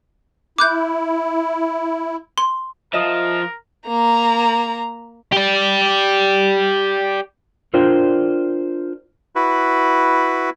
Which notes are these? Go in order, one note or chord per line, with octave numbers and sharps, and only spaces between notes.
E4 D6 F#6 G6
C6
F3 A#4 D#5 E5
A#3 A#5
G4 D5
D4 F4 A#4 C5 D5 G5
E4 F#4 B4